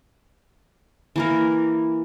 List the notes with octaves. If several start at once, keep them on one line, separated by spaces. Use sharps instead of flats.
E3 A#3 A#4